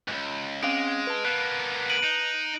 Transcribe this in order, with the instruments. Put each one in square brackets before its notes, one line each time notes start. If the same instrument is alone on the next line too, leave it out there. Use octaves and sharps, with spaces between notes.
[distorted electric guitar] C#2 G#2
[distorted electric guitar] G#3 [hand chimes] C4 C#4 F5 [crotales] D7 F7
[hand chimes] B4 A5
[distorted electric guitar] A#3 B3 [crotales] F#6
[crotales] D7 D#7 F#7
[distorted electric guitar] D#4